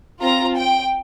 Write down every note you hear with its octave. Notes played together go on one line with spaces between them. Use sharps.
C4 F4 A#5
G5